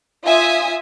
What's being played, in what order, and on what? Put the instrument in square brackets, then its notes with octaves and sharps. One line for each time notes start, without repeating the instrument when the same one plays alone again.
[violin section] F4 E5 G#5 D#6